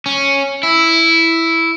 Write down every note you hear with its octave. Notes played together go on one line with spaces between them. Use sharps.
C#4
E4